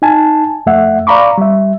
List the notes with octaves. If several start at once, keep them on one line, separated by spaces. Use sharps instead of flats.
D#4 G#5 A5
F2 A3 E5 F#5
D5 F5 A#5 B5 C#6 D6
G3 E5